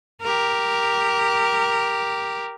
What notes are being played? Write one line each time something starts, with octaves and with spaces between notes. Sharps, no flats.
G4 A#4